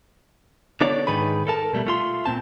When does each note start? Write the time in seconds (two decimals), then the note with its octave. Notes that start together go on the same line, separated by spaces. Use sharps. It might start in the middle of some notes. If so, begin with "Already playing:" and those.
0.81 D3 B3 D4 C#5 D5
1.07 G#2 D#3 G#4 B4 B5
1.47 A4 A#4 A5
1.73 B2 G3 A3
1.86 A3 F4 C6
2.26 A#2 C4 A5